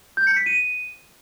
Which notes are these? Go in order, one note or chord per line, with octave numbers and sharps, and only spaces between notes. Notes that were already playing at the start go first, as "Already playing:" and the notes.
G6
C#7
B6
D#7